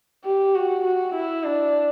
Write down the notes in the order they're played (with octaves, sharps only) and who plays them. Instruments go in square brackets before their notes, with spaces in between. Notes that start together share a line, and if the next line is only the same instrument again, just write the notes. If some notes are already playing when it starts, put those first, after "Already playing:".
[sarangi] G4
F#4
F#4
E4
D4